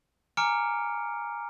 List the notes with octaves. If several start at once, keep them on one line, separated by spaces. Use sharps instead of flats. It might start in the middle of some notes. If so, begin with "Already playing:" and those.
G#5 A#5 D6 F6 C#7 D7